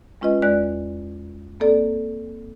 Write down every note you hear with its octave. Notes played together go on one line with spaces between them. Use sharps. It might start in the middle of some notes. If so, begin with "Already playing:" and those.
G#3 C#4 F4 B4 D#5
E2 G#3 D5 F#6
A#3 C4 A4 D5